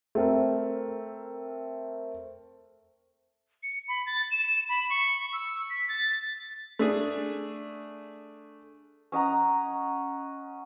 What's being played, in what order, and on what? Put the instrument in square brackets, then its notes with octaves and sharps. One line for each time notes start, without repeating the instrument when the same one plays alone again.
[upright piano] A3 C4 A#4
[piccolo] C#7
B5
A6
E7
B5
C#6
E6
B6
A6
[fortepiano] A3 D4 G#4
[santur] C#4 D#5 F#5 A#5